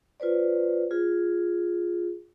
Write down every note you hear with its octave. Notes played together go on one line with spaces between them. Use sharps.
F4 B4 C5 D5
F4 G#4